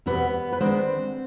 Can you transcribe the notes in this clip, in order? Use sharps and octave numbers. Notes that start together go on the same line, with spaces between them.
E2 B2 G3 B3 C4 B4
B4
D#3 G#3 B3 C4 D4 C5